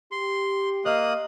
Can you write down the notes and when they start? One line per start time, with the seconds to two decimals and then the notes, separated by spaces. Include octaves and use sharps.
0.12 G4 C6
0.85 A#3 D#5 D#6 F6 F#6